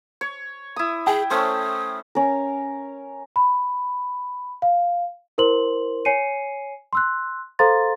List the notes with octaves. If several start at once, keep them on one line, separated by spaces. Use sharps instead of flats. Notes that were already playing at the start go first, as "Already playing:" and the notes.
C#5
E4 D#6
G#4 G5
A3 C#4 C5 D#6
C#4 A#4
B5
F5
E4 A#4 C5 C6 F#7
C#5 G#5 C7 C#7 D#7
C6 E6 F#6
A4 C5 F5 A#5 C6 A6